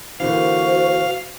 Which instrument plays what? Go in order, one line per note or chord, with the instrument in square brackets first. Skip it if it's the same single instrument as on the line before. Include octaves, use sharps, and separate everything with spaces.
[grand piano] A#2 D3 E3 [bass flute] F#4 [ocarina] C5 [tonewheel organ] F5